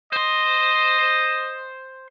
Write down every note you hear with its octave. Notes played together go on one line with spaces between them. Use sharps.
C5 D#5 C6